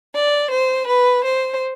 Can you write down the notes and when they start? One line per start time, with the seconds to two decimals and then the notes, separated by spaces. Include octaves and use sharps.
0.15 D5
0.51 C5
0.87 B4
1.24 C5